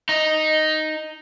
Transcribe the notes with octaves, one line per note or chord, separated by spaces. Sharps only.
D#4